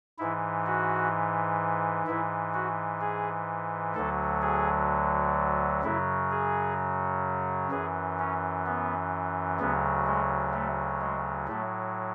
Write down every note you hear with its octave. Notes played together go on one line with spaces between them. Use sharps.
G#2 E3 E4
F#4
G#2 E3 E4
F#4
G#4
D2 D3 F#3 A4
G#4
F#2 C#3 F#3 E4
G#4
F#2 E3 G#4
C#4
B3
D2 C#3 F#3 B3
G#3
A3
G#3
A2 F#3 A3